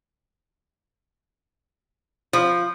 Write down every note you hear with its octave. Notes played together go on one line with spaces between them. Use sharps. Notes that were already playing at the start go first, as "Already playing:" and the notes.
F3